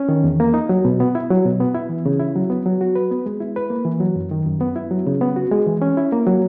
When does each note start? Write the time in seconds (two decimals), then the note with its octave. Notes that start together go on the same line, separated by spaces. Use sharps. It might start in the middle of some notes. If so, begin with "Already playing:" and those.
Already playing: C#4
0.09 D#3
0.24 E2
0.40 A#3
0.54 D#4
0.69 F#3
0.85 B2
1.00 B3
1.15 E4
1.30 F#3
1.45 B2
1.60 B3
1.75 E4
1.89 E3
2.06 C#3
2.19 E4
2.36 F#3
2.50 B3
2.66 F#3
2.81 F#4
2.95 B4
3.11 B3
3.26 G#3
3.41 E4
3.56 B4
3.70 A#3
3.85 E3
4.00 F#3
4.16 F#2
4.31 D#3
4.46 F#2
4.61 B3
4.76 E4
4.91 F#3
5.07 C#3
5.21 B3
5.36 F#4
5.51 G#3
5.67 E3
5.82 C#4
5.97 E4
6.12 A#3
6.27 F#3